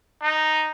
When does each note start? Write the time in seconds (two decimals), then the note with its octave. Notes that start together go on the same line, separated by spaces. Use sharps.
0.22 D#4